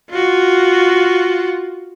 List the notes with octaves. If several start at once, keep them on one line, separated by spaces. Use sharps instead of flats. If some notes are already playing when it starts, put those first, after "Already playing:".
F4 F#4